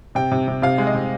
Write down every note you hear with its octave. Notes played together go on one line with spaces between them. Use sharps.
C3 G5
C3
C3
C3 F5
G#3
D#5
C3